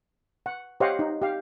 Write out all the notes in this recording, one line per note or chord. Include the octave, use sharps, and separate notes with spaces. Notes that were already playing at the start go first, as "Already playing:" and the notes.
F#5
G4 C5 C#5 D#5 F5 F#5
D#4
G4 F5